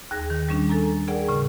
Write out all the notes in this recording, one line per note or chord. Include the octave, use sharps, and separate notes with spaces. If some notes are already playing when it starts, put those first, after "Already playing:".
D#2 G#4 A#6
D#3
G3 C#4 D4
A4 G#5 A#5
G#4 A#4 D5 F#5 G5
A2 C#3